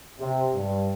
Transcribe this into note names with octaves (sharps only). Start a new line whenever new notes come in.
C3
G2